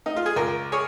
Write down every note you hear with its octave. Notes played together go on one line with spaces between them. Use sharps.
D#4
F4
G#4
C#2 F4 A#4
G#4 C#5